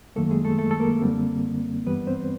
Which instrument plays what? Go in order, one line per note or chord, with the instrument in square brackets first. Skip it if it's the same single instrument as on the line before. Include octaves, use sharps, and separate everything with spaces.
[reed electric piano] F#2 D#3 F#3 A3 A#3 A4
G#3 G#4
A3 A4
A3 A4
A4
A#3 A#4
F#2 D3 G3 C4
G2 E3 G3 B3 B4
C4 C5